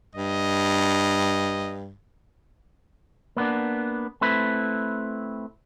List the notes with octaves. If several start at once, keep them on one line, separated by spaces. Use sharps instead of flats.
G2 D#5
A#3 B3 D4
A3 C4 E4 B4